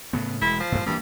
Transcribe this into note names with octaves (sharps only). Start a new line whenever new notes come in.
A2 C#3 B3
E1 G#3 E4
F3
G2 A#2
G2 E3 F3 A#3